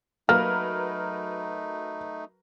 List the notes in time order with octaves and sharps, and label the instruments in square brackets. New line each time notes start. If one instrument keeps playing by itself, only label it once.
[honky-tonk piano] F#3 A#4 B4 [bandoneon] A3 D#4 [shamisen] A#3 [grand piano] F6